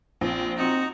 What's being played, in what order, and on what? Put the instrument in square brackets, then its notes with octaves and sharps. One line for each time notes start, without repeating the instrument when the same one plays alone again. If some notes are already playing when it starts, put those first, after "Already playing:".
[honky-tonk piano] A#1 [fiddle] C4
[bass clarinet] C4 [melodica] D#4 A#5 [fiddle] F#4